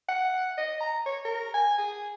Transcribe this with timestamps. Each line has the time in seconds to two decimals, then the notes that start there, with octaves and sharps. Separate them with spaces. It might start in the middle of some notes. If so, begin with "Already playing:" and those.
0.09 F#5
0.58 D#5
0.81 A#5
1.06 C#5
1.25 A#4
1.54 G#5
1.78 G#4